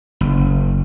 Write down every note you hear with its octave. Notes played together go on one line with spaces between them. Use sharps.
F#1